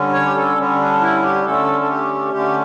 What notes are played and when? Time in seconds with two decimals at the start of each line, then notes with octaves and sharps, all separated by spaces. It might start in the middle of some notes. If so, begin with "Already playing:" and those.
Already playing: D3 G3 C#4
0.13 C#5
0.25 G4
0.35 A4
0.57 D3 G3 C#4
0.79 D4
1.01 E4
1.22 G4
1.45 D3 A3 C#4 A4
1.81 A4
1.89 G4
2.32 D3 A3 C#4 G4